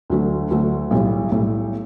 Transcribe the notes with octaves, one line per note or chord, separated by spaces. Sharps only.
D2 D3 F#3 A3
D2 D3 F#3 A3
B1 A2 G3
B1 A2 G3